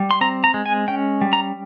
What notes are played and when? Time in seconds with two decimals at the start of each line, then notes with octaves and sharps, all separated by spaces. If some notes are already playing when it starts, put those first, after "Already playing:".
Already playing: G3
0.11 C6
0.21 C4 A#5
0.44 A#5
0.54 G#3
0.66 G#5
0.88 C#4 G5
1.21 G3
1.33 A#5